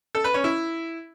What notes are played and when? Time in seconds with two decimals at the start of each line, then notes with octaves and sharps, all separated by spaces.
0.15 A4
0.24 B4
0.34 C#4
0.44 E4